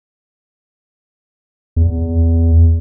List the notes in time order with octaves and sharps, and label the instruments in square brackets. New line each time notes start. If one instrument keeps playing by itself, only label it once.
[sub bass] E2